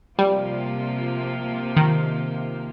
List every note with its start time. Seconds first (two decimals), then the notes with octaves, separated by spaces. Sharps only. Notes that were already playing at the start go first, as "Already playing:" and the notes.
0.17 C3 F3 G3 A#3 F4
1.76 D#3